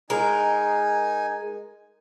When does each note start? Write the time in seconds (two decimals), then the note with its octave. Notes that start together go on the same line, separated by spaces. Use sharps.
0.10 G#3 D#4 A#4 G#5